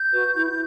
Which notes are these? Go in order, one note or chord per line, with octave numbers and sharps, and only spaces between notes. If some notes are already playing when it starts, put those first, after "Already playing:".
Already playing: G6
F#4 B4
E4